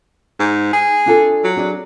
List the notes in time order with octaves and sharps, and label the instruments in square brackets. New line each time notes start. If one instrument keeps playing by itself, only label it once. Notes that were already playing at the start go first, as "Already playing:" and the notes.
[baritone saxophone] G#2
G#4
[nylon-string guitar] D4 F4 A4
[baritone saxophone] F#3
[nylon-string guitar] D4 G#4 D5